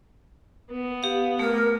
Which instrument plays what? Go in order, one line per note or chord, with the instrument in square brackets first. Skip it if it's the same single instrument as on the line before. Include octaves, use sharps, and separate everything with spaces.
[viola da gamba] B3
[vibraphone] G4 F5
[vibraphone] A3 [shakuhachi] A#4